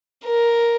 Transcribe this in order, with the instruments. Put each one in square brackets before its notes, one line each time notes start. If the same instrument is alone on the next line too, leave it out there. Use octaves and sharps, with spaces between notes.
[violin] A#4